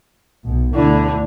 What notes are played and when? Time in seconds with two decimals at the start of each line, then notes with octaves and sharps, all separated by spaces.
0.44 B1 B2
0.74 D2 D3 E4